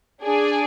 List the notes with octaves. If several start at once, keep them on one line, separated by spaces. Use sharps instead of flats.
D4 G#4 D5